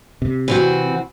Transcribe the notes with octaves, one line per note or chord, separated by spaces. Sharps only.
C3
E3 C4 F#4